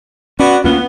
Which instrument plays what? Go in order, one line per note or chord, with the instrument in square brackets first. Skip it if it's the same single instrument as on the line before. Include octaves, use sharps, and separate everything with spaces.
[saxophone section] B3 F#4 [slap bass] C#4 [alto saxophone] D5
[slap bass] D2 A#3 C#4 [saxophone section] B3 [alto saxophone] F4